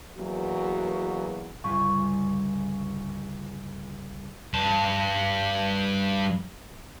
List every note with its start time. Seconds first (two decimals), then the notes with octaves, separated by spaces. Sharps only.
0.17 E2 B2 F#3 A#3 F#4
1.64 G1 C#2 C#6
4.54 G2 A5